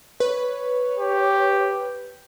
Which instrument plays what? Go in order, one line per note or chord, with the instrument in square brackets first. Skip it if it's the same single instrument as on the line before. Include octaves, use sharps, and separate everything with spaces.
[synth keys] B4 [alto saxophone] C#5
[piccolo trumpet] G4